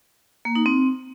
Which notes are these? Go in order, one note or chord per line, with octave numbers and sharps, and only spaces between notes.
A#3
D#4
C4